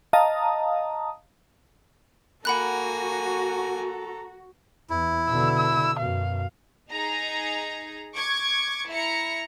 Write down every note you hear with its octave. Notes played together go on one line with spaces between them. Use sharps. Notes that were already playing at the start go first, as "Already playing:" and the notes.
D#5 F5 A5 A#5 D#6
A#3 F#4 A4 F#5 G#5 A#5 B5 F#6
E2 E4
B2 D3 E6
E6
F#2 B2 F5
D#4 G#4 A#5
C#6 D6 G#6
E4 A#5 C#7